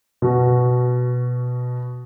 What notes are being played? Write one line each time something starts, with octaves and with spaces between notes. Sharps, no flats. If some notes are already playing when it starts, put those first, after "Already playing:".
B2 F#4